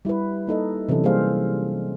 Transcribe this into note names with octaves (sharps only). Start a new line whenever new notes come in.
G3 E4 G4 B4
A#3 D#4 A4 D#5
C3 E3 F#3 C#4 A4
G3 A#3 C#4 G#4 C5 F5